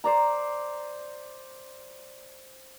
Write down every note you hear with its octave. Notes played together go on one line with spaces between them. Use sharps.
C5 D5 A#5